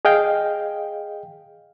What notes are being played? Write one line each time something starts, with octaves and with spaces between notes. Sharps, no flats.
G#4 D#5 F5 G5